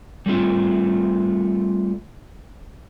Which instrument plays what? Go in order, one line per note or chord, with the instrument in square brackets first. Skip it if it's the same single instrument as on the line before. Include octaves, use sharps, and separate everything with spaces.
[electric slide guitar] G3 A3 C4 F4